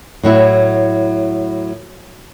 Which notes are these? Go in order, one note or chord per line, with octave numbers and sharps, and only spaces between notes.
A2 F#3 E4